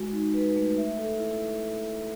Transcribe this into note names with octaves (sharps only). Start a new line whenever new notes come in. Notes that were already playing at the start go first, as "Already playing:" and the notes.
Already playing: G#3 F#4
D#4
B4
A3
E5
A4
E4